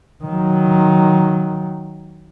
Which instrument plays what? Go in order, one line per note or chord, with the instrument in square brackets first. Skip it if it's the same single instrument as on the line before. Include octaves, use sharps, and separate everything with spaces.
[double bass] D#3 F#3